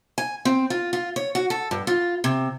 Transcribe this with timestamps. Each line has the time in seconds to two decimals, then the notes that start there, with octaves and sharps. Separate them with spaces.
0.18 G#5
0.45 C4
0.70 F4
0.93 F4
1.16 C#5
1.35 F#4
1.50 A4
1.71 G2
1.87 F4
2.24 C3